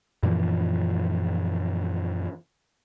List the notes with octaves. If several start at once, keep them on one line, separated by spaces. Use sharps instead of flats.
F#2 A#2 E3 F3